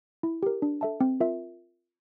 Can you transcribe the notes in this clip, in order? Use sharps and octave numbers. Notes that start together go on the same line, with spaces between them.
E4
G4 A#4
D4
A4 E5 A5
C4
F4 A#4 E5